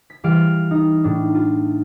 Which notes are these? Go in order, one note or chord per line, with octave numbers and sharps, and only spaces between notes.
B6
E3 G3 F5 D7
D#4
A2 D4
F4